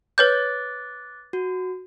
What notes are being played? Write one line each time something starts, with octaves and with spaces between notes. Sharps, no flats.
B4 C#5 D6 F#6 G6 A6
F#4